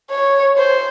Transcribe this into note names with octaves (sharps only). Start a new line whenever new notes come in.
C#5
C5